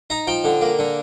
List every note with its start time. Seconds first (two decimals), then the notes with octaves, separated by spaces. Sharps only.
0.10 D#4 A#5
0.27 F3 G5
0.44 D3
0.61 A#3
0.79 D3